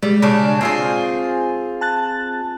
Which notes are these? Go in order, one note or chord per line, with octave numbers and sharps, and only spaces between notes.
G3 G#3
C#3 D4
C4 F4 G#4 G#5
A5 F#6 A6